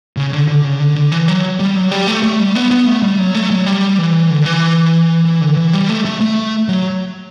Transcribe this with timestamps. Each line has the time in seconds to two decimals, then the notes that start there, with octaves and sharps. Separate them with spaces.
0.17 C#3
0.33 D3
0.48 D3
0.64 C#3
0.80 D3
0.96 D3
1.12 E3
1.28 F#3
1.59 G3
1.76 F#3
1.91 G3
2.07 A3
2.23 A3
2.39 G3
2.55 B3
2.71 B3
2.87 A3
3.03 G3
3.19 F#3
3.35 A3
3.51 F#3
3.66 G3
3.98 E3
4.30 D3
4.46 E3
5.25 E3
5.41 D3
5.57 E3
5.73 G3
5.89 A3
6.05 A3
6.21 A3
6.69 F#3